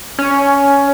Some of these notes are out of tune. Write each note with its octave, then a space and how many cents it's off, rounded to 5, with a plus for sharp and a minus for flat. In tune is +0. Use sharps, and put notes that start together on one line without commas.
C#4 +10